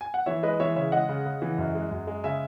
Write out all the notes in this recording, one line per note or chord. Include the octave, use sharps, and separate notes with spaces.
G#5
F#5
E3 C#5 E5
G#3 B4 D#5
D#5
E3 C#5 E5
C#3 C#5 E5
G#3 D#5 F#5
C#3
C#3
E3
F#2
G#3
F#2
G#3
C#3 E5 G#5